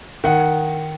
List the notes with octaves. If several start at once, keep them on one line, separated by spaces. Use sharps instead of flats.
D#3 F#5